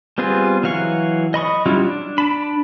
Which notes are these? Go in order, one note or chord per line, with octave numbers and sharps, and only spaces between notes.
G3 B3 C4 F4 G#4
E3 F#3 F5 F#5 C#6
D#5 B5 C#6 D#6
F#3 G3 C#4 E4 F4
D4
D4 A5 B5